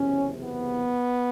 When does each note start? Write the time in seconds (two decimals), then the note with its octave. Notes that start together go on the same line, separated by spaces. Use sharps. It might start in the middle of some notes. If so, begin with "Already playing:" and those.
Already playing: F#1 E2 C3 C#4
0.44 B3